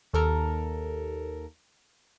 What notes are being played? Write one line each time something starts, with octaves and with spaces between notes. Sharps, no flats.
D#2 A4 A#4